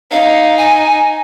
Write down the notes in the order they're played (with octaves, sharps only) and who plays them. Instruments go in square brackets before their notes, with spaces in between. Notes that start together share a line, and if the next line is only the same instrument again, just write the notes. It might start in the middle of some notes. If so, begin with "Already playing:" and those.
[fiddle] D#4 [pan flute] F5
[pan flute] G#5